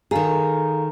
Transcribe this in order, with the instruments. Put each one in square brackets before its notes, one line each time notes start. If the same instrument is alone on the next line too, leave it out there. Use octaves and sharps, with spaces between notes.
[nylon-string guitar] D#3 G#4 [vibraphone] A4 F5 A#5